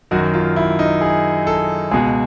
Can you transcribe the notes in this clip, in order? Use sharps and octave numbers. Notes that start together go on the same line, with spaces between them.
F#2 D#3 F#4
F4
E4
D#4
G#4
A4
C#2 B2 G#4